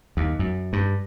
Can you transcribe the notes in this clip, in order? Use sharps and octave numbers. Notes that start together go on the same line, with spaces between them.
D#2
F#2
G2